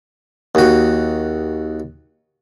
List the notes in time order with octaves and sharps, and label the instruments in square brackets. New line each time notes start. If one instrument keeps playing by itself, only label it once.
[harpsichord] D#2 F#4